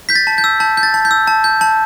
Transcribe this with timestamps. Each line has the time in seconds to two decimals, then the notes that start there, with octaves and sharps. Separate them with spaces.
0.09 G6 B6
0.16 A6
0.27 A5
0.38 G6
0.44 E6
0.60 A5 G6
0.77 G6
0.83 A6
0.94 A5
1.05 G6
1.11 E6
1.27 A5
1.44 G6
1.61 A5